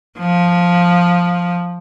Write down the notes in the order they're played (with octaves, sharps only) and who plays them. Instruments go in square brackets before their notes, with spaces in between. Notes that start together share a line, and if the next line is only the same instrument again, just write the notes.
[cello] F3